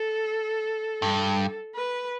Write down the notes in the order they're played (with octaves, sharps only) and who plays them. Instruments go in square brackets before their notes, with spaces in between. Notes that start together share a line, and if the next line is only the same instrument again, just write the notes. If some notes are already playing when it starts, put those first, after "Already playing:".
Already playing: [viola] A4
[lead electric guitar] G2
[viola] B4